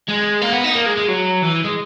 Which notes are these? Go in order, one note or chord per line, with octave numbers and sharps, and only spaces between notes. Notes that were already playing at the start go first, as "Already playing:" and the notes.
G#3
A#3
B3
D#4
A#3
G#3
G#3
F#3
E3
G#3